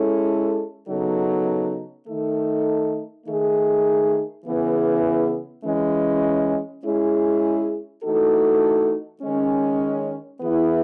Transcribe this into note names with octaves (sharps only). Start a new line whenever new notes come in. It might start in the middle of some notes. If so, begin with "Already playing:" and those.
Already playing: G#3 C#4 E4 A4
C#3 F#3 B3 D#4 A4
D#3 A3 D#4 A4
D#3 A3 D#4 G#4
C#3 E3 B3 E4 G#4
E3 G#3 C#4
G#3 C#4 E4 G#4
E3 A3 D#4 F#4 A4
D#3 G#3 C#4
E3 B3 E4 G#4